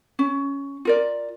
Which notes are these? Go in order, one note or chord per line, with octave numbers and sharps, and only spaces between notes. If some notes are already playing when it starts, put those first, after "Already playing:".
C#4
F4 A#4 D5